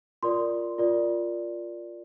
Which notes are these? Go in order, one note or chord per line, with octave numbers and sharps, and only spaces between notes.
F4 A#4 D5 C6
F4 A#4 D5